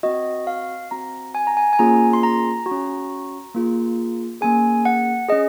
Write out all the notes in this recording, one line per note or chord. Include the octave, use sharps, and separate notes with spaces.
C4 F#4 D#5
F5
C4 F#4 A#5
G#5
A#5
G#5
G#5
A#3 C#4 F4 G#4 A#5
C6
A#5
F#4
C#4
A#3 F4 G#4
A#3 C#4 G#4 G#5
F#5
C#4 G#4 D#5